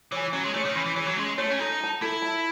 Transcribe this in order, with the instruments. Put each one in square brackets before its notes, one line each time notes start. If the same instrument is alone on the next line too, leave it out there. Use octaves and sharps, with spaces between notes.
[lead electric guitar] E3 [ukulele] G#4 C#5
[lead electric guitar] F#3 [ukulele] C#4
[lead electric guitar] G#3
[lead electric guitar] A3 [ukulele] G#4 C#5
[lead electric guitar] D#3
[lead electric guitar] E3 [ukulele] C#4
[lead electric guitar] E3
[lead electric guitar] E3 [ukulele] G#4 C#5
[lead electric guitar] F#3
[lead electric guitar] G#3 [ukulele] C#4
[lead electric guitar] A3 [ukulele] G#4 C#5
[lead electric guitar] C#4
[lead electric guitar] D#4 [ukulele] A4
[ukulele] E5
A5
[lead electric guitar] E4 [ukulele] A4
[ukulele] E5 A5